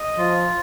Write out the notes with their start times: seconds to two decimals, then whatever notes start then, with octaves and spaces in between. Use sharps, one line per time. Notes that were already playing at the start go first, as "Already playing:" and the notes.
Already playing: D#5
0.17 F3 F4